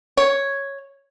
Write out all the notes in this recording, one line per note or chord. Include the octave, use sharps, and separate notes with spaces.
C#5